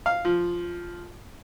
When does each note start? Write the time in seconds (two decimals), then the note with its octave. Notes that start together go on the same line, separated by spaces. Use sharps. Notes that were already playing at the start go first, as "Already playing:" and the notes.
0.06 F5
0.25 F3